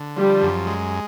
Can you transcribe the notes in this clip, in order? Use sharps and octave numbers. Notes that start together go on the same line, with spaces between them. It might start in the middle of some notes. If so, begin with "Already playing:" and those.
Already playing: D3
F3 G3
F#2
G#3